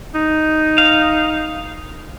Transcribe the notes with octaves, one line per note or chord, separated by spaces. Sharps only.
D#4
F5